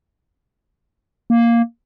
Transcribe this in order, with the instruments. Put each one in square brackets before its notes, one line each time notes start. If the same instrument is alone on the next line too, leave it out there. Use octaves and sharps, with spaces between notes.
[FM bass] A#3